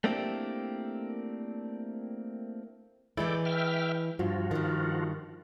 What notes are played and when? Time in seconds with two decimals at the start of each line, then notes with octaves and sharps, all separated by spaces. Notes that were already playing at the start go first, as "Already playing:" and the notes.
0.04 A3 A#3 C4 D4 E4 G4
3.17 E3 G#3 E4 A4 D5 G5
3.45 E5 G5 F6
4.19 G2 F3 F4 F#4
4.51 G2 D#3